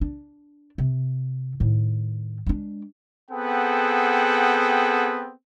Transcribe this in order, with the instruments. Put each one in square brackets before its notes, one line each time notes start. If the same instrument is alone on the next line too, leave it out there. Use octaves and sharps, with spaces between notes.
[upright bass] D4
C3
A2 D#3
G#3 D4
[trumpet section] B3 C4 G#4 A4 F#5 G5